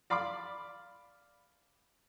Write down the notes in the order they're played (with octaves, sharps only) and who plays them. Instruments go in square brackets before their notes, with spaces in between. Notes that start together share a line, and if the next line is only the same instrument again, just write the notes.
[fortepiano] D5 F5 B5 C6 D6